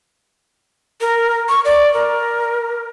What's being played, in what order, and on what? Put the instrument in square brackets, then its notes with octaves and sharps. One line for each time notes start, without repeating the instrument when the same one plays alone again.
[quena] A#4
C#6
D5
A#4